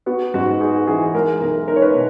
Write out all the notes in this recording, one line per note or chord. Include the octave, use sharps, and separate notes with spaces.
B3 F#4
G#2 F#4
D#4 G#4
E3 G#4
G#3 A#4
B1 A#4
D#4 A#4
C#5
B4
B2